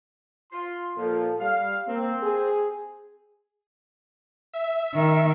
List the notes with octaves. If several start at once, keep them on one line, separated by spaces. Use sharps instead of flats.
F4 C6
A#2 F3 A4
G3 F5
A#3 C4
G#4
E5
D#3